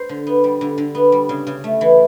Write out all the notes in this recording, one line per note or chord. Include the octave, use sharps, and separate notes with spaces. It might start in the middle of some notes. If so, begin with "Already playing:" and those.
Already playing: C5
D3
B3
G3
D3
D3
B3
G3
C#3
C#3
A3
E3